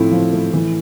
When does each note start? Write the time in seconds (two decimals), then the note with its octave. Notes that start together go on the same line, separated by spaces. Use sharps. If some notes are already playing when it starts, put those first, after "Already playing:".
Already playing: A2 F3 C4 E4
0.11 F3
0.33 A2
0.53 E3